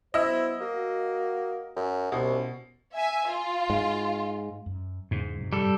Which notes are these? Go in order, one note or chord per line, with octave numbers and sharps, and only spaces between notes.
F#3 B3 E4 C5 D#5 E6
A#3 F#4
F#2
C2 B2 C#4 C5
E5 G#5
F4
G#2
F#2
E2 G#2 C#3 G#3
F#2 C3 F#3
G3 A4